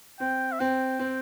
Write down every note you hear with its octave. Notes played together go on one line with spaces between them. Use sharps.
C4 G5
E5
C4 G5
C4